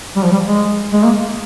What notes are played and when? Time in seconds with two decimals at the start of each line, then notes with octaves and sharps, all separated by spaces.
0.16 G3
0.24 F3
0.32 G3
0.45 G#3
0.93 G#3
1.04 A#3